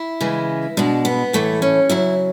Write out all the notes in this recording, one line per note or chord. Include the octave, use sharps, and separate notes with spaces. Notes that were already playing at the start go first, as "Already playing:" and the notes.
Already playing: E4
C#3 E3 G#3
B2 G#3 D4
B3
A2 E3 G#3 A3
C#4
C#3 F#3 E4